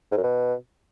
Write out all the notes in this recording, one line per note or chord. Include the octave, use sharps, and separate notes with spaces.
G#2
F#2
B2